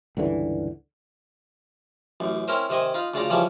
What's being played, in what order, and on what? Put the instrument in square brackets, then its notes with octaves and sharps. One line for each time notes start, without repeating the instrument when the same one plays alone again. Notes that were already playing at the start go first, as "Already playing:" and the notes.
[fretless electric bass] C#2 G2 D3 E3
[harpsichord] A1 F#2
C4 C#4 E4 A#4 C5
C3 D#3 C5 D#5 G#5
D#4 F4 F5 B5
D2 C#3 F4 D5 F5 A#5
C#3 E3 F3 G3 C#4